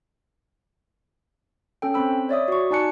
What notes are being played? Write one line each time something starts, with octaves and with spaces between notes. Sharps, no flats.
C#4 A4 G5
C4 C5 B5 E6
C#5 D5 E5 D#6
F#4 C#6
D#4 D5 G#5 A5 F#6 C#7